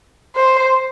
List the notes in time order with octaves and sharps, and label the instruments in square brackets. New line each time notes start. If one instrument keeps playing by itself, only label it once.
[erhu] C5